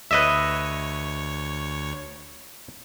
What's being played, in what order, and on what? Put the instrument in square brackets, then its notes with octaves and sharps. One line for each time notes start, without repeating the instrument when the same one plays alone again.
[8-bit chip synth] D2 C#5 [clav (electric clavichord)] B4 D#5 E5